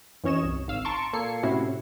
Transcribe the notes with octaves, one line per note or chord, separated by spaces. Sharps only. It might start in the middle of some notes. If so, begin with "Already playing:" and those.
F#2 E3 C#4 C#5 D#5 E7
C2
G#1 F5 E6
A5 A#5 C6 C#6 D7
A#2 A#3 A4 G#6 C7 C#7
A2 C3 C#4 E4 F#4